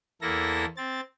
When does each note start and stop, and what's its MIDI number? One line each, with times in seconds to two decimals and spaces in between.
0.22 0.65 40
0.22 0.65 58
0.22 0.65 64
0.22 0.65 69
0.22 0.65 94
0.77 1.00 60
0.77 1.00 93